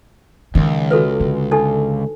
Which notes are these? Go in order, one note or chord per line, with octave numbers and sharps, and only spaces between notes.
C#2 D#3 F#3
F#4 A4 B4
D3
D4 D#4 A4